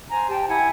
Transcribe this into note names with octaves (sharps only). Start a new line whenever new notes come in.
C5 G#5 A#5
G4 G5 A5
A5
E4 F#5 G#5